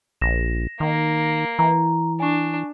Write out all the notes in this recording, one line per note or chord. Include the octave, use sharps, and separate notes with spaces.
A#1 A#6 E7
D#3 A#3
E3 A#5
D4 G#5 C#6